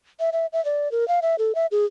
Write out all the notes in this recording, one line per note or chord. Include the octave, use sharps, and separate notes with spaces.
E5
E5
E5
D5
A#4
F5
E5
A4
E5
G#4